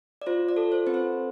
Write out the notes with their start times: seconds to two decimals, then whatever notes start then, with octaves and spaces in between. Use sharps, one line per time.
0.22 D5
0.26 F4 C5
0.49 D5
0.56 A4
0.72 C5
0.87 C4 B4
0.94 C5